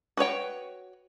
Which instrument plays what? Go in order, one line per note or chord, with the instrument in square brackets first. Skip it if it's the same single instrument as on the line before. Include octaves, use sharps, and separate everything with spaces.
[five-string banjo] F#4 B4 C#5 G5